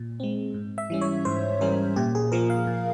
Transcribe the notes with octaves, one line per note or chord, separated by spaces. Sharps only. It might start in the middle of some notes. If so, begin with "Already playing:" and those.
Already playing: A#2
G#3 C4
G#2
E5
E3 G3 C#4
C#5
G#2 C5
E3 G3 C#4 A#4
A#2 G4
G#4
F3 A#3 A#4
F5
A#2